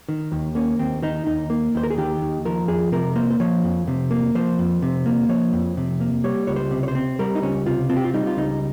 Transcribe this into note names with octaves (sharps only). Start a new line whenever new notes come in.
D#3
D#2
A#3 C#4
D#2 C4
D#3 D#4
D#2 D#4
A#3
D#2 C5
A#4
G#4
D#3 G4
D#2
F3 A#4
F2 G#4
C3 A#4
A#3 C5
C5
F3 C#5
F2
C3
A#3
F3 C5
F2
C3
A#3
F3 C#5
F2
C3
A#3
G3 C#5
C#2 C#5
C5
C3
C#5
C5
C4
G3 A#4
D#4
C#2 C#4
C3 F4
C4 F4
G4
F4
G3 D#4
F4
C#2 D#4